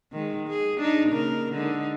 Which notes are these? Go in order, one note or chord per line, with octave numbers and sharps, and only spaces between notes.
D#3 G#3
G#4
D4 D#4
C#3 A#3 A#4
D3 G#3 D#4